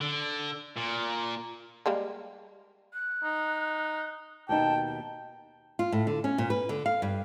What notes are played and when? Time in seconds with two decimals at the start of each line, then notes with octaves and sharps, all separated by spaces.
0.01 D3
0.76 A#2
1.86 G3 G#3 A#3
2.93 F#6
3.23 D#4
4.49 D#2 B2 D#4 G5 A5
4.87 G5
5.79 F4
5.92 A2
6.07 D3
6.24 C#4
6.38 A#2
6.50 B4
6.69 D3
6.86 F5
7.02 G2